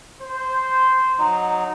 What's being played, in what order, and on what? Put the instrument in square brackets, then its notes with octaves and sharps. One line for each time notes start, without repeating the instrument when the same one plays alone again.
[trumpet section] C5
[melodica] F#3 D#4